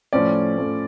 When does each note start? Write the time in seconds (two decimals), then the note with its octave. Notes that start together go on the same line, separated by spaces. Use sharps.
0.13 A2 F3 A3 C#4 D5
0.57 A2 F3 A3 C#4